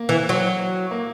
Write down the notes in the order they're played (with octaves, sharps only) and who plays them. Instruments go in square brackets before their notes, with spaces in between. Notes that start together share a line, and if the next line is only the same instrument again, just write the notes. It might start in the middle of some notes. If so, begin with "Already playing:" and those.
Already playing: [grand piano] A#3
[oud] E3
F#3
[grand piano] A#3